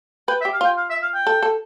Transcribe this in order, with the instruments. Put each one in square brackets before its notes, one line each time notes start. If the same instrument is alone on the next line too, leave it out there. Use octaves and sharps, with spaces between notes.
[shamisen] B4 [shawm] G5
[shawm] E5
[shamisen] G4
[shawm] F5
[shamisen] F4 [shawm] G5
[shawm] F5
E5
F5
G5
[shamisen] A4
A4